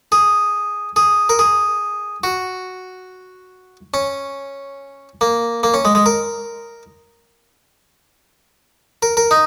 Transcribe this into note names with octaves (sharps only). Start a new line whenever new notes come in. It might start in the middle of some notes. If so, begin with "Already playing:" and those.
G#4
G#4
A#4
G#4
F#4
C#4
A#3
A#3
C#4
G#3
G#3
A#4
A#4
A#4
D#4